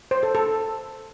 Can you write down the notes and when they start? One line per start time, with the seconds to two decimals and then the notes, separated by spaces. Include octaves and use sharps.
0.11 C5
0.23 A4
0.35 A4